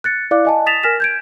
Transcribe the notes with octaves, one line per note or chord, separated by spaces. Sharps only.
F#6 A6 C#7
E4 D5 F5 D6 F#6
D#5 G#5 A5
D#6 A6 B6 E7 F7
A#4 G#5 F6 A#6 B6 E7
G6 G#6 D7